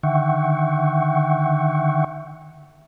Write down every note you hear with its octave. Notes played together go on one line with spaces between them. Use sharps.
D3 D#3 E5 F#5 G5 C#6